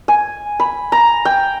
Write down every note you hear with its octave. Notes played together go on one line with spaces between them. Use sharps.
G#5
B5
A#5
G5